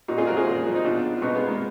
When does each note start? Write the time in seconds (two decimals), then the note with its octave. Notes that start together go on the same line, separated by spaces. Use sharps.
0.08 A#2 D#4 F#4
0.18 F4 G#4
0.27 F3 F#4 A#4
0.37 F4 G#4
0.47 A#2
0.65 F3
0.75 D#4
0.84 B2 D4 F4
1.17 F4
1.22 B2 B3 D#4
1.35 G#3 B3
1.47 A#3